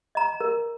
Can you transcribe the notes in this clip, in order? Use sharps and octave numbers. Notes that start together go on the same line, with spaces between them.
D#5 A#5
A#4